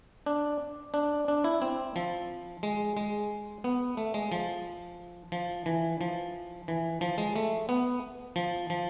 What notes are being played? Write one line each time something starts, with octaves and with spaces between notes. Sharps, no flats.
D4
D4
D4
E4
C4
F3
G#3
G#3
B3
A3
G#3
F3
F3
E3
F3
E3
F3
G#3
A3
B3
F3
F3